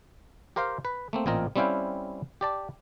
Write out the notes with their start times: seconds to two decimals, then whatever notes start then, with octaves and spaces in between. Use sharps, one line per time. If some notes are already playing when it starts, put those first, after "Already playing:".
0.56 G4 A#4 C5 F5 G5
0.85 B4
1.13 A3 A#3 C4
1.26 A1 A#2 C4 F4 A#4 D#5
1.56 G3 C4 C#4 E4 F5 G5
2.41 G4 D5 A5